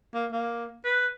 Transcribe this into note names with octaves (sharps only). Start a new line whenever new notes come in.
A#3
A#3
B4